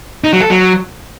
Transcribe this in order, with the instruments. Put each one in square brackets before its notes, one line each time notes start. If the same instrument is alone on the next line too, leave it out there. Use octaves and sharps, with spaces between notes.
[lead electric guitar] D#4
F#3
A4
F#3